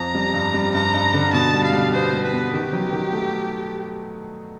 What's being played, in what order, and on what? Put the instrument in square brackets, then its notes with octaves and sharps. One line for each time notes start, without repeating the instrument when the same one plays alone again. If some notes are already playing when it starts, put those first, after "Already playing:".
Already playing: [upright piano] F2 [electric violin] A#5
[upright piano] G3
G2
G3
[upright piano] G2 [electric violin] A#5
[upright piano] G2
D3
[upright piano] B2 [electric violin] A5
[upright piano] G3
[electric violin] F5
[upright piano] G3
[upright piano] B3 [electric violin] C5
[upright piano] G3
[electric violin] B4
[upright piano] B3
[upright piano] D#3 [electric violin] G4
[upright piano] F#3
D#3
A3